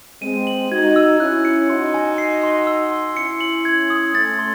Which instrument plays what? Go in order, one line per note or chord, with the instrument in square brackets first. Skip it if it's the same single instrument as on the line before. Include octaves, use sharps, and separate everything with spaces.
[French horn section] G#3 C4 [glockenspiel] D#7
[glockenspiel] F#7
[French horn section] D#4 F#4 [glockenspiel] G#6
[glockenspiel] E6
[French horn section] C#4 E4 [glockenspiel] F#6
[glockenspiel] C#7
[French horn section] D#4 F#4 [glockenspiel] C6
[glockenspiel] G#5
C7
C6
E6
C6
[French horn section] C#4 E4 [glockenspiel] C#7
[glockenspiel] F#7
G#6
D#6
[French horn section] A3 C#4 [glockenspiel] A6
[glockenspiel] C6